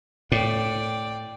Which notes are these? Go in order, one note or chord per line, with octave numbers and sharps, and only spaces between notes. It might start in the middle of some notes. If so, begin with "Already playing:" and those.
A2 D5 G5